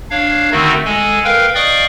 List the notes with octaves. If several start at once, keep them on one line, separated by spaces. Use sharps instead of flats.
D4 C#5 F5
D3 D#3 A3 C4 D#4 F#4
G#3 A4 G#5
A#4 B4 F5 G5
D5 D#5 F5 G5 C#6 D#6